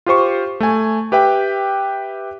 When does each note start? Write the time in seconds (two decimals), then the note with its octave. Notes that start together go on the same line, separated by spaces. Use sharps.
0.06 F4 G4 C5 C#6
0.60 A3 G#5
1.12 G4 B4 E5 G5